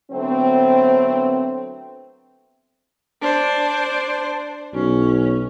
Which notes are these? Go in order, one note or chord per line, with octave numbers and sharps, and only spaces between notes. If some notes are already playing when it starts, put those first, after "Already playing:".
D3 F#3 A3 B3 C4
D4 C5
B1 C#4